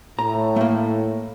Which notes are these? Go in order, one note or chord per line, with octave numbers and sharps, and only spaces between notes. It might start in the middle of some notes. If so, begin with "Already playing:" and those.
A2 A#5
A3 A#3